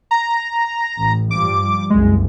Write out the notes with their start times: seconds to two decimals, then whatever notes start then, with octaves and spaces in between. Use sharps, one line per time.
0.11 A#5
0.98 A1
1.31 G2 F3 G3 D6
1.90 F#1 C2 G#3